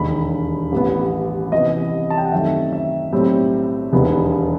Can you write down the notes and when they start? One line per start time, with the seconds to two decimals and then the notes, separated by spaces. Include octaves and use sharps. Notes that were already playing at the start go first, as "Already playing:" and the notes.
Already playing: E1 D#2 D#3 B5
0.72 A1 A2 G3 B3
1.52 C2 C3 E3 B3 D#5
2.10 A5
2.18 G5
2.25 F#5
2.32 F#2 D#3 A3 C4 E5
2.73 E5
3.12 B1 A2 G3 C4
3.92 E1 D#2 D#3 G3 B3